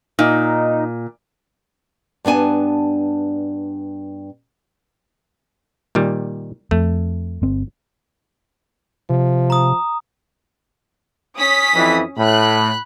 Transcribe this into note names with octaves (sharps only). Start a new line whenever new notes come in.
A#2 D#4
G2 B3 D4 G#5 A5
A#2 D#3 G3
F2 A3
G1 C4
C3 F3
A#5 D#6
C#4 D#6 B6
F2 E3
A2 B5 F#6